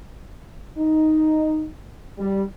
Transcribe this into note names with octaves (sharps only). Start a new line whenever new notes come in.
D#4
G3